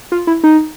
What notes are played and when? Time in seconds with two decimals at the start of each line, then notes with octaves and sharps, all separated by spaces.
0.12 F4
0.27 E4
0.44 D#4